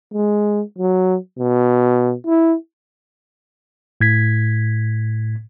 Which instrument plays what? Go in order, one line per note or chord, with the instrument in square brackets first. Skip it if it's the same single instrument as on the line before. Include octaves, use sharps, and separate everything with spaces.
[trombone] G#3
F#3
B2
E4
[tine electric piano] A2 G#6 B6